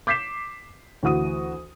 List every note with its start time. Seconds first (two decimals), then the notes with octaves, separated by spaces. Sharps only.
0.07 D6 G6 B6 C7 E7
1.03 D2 E3 F#4 D#6 D#7